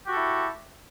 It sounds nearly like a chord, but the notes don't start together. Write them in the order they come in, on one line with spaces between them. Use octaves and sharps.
G4 F#4 A4 E4